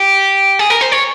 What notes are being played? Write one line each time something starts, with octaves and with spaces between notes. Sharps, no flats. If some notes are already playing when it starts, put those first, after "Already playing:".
Already playing: G4
G#4
A#4
C5
C#5